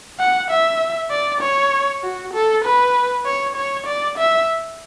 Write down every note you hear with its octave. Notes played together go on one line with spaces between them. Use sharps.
F#5
E5
D5
C#5
F#4
A4
B4
C#5
C#5
D5
E5